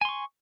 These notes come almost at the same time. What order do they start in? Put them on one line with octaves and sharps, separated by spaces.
G#5 C6 C#6